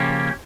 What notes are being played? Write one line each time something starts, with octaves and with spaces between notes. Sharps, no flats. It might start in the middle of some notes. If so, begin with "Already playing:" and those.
Already playing: C#3 F3 A#3 C#4 G4